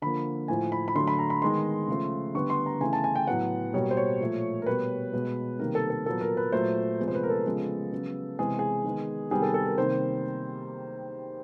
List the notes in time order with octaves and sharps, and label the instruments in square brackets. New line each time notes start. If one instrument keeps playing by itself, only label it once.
[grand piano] D3 F3 A#3 B5
A2 F3 A3 G#5
B5
B5
D3 F#3 A3 C6
B5
A#5
B5
D#3 G#3 B3 C6
C#3 F3 A3
D3 G3 B3 C#6
C6
A#5
C#3 E3 A3 G#5
A5
G#5
G5
A2 F#3 B3 F#5
B2 G3 A#3 C#5
C5
C#5
A#2 F3 A3
A#4
B2 G3 B3 B4
B2 G#3 B3
C3 D#3 G3 A#3 A#4
A4
A4
A#2 F#3 B3 A4
A#4
B4
A#2 F#3 A3 C5
C3 F3 G#3 B3
C5
B4
A#4
A4
C#3 F3 G#3 B3
C#3 F#3 B3
C3 E3 G#3 B3 G#4
G#4
D#3 G#3 B3
C3 D#3 G3 B3 G#4
A4
A4
A#4
C3 D#3 G3 A#3 C5